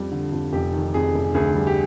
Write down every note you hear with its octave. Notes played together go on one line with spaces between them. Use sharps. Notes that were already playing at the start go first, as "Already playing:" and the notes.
Already playing: F2 G3
D3
F2
F1 G4
D#3
F2 G#4
F1
D2 G#4
G3
G4